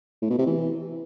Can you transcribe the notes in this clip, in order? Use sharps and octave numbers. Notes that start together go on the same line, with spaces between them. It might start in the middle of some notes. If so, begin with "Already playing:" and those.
A2
B2
C3
E3